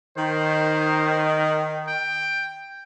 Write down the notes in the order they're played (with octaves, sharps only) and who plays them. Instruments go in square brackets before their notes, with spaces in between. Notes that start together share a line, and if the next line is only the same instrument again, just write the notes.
[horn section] D#3 [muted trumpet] C5
[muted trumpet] G5